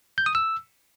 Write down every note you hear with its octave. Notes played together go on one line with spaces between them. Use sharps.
G6
D#6
E6